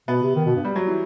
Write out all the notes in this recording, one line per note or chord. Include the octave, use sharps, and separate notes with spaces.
B2 B3
C3
D#3
B2
G2
G3
F#3
E3